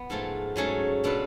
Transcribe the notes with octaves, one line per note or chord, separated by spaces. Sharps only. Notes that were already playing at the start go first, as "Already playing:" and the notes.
Already playing: B3
G#2 F3 A3 F4
G#2 F#3 A3 C#4 G#4
B2 A3 D4 F4 B4